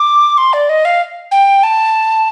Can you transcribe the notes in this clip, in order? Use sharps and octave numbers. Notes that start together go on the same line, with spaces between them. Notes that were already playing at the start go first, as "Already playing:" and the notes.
Already playing: D6
C6
D5
D#5
F5
G5
A5